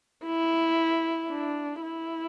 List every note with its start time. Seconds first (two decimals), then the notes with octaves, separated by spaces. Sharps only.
0.25 E4
1.30 D4
1.82 E4